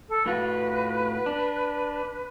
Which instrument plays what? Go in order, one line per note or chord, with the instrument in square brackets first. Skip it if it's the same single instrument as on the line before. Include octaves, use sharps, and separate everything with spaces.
[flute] A4
[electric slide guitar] A2 F4 F#4 [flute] B4
[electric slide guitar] D4